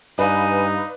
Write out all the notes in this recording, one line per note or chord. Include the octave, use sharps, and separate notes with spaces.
G2 D#4 B4 D5 F5 G#5